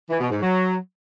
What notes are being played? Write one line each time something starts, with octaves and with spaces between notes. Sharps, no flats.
E3
B2
G#2
F#3